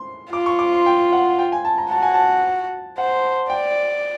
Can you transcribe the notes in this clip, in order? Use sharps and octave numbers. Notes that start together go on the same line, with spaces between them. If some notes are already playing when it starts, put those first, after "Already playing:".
Already playing: C6
F4 D6
C#6
D6
C6
G5
F#5
G5
G#5
A5
A#5
F#4 A5
G#5
A5
C5 F#5
D5 G5